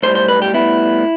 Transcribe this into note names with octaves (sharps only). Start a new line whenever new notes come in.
B1 A2 G3 C5
C5
B4
G4
A2 G3 B3 E4